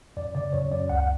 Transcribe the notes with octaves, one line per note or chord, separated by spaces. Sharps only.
F#2 D5
C#3 D5
F#2 C#5
F#2 D5
C#2 F#5
F#5